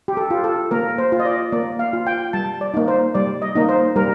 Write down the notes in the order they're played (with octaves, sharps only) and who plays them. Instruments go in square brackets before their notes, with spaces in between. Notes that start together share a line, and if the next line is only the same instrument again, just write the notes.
[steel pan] G4
A4
F4
A4
A#3 A#4
C5
F4
D#5
D5
A#3 D5
F5
F4
G5
G3 A5
D5
A#3 D#4
C5
G3 D5
D#5
A#3 D#4
C5
G3 A#4